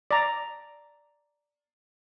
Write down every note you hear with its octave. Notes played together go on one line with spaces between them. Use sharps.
D5 A#5